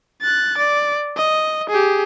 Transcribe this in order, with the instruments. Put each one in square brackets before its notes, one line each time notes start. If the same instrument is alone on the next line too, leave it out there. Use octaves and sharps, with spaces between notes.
[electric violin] F#6 A6
D5
D#5
G4 G#4